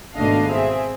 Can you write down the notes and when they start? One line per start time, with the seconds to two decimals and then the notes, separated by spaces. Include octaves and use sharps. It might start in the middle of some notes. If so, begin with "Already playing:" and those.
0.16 G#1 B2 A3 D4 D#5 F5
0.49 C4 G#4 E5